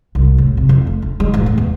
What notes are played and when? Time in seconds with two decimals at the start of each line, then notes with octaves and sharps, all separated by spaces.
0.15 C2
0.38 A2
0.57 C3
0.69 F2
0.87 A3
1.02 D4
1.20 G#3
1.34 A1
1.46 A3
1.58 E2